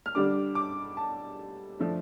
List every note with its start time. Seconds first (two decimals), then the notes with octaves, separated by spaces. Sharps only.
0.06 F6
0.15 D3 G3 D4 D6
0.55 D6
0.97 A5
1.79 F3 A3 D4